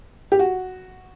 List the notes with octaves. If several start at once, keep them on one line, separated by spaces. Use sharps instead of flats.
G4
F#4